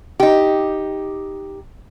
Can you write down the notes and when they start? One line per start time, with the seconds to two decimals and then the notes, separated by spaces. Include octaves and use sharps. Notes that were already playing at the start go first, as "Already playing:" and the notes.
0.20 D#4 G4